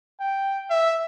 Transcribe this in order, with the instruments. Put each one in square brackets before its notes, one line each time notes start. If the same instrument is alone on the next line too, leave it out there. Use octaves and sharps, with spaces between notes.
[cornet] G5
E5